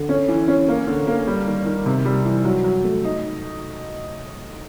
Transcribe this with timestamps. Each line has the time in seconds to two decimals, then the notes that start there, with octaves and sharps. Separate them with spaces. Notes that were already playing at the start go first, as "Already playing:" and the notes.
Already playing: D3
0.09 C#4
0.28 E3
0.48 C#4
0.68 A#3
0.87 D3
1.07 A#3
1.27 G3
1.47 D#3
1.66 D#3
1.86 C3
2.05 G3
2.25 E3
2.45 F#3
2.64 F#3
2.84 A3
3.04 D#4